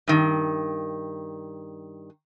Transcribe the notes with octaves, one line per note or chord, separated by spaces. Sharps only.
G2 D#3